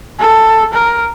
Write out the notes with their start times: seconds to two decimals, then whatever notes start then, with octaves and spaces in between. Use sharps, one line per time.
0.19 A4
0.73 A#4